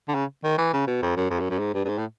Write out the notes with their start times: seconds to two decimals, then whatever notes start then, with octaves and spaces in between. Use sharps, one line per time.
0.09 D3
0.15 C#3
0.44 D#3
0.58 E3
0.73 C#3
0.87 B2
1.02 F2
1.17 F#2
1.30 F2
1.40 F#2
1.50 F#2
1.59 G#2
1.74 G2
1.85 G2
1.89 G#2
1.98 A2